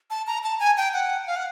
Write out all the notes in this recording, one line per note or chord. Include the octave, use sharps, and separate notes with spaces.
A5
A#5
A5
G#5
G5
F#5
F5
F#5